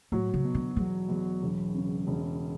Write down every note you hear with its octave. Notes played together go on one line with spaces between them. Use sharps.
A2 F#3
C#3
B2
D3
E2 F#3
E2
E1
C#3
E1